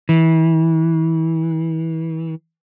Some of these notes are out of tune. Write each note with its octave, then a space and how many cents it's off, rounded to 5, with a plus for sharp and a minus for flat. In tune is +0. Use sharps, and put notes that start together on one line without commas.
E3 -30